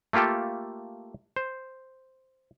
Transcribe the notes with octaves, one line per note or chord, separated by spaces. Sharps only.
A3 A#3 F4 G4 A4
C5